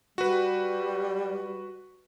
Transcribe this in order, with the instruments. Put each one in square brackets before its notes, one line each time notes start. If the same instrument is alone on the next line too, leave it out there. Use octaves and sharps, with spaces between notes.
[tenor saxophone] G3 [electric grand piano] F#4 B4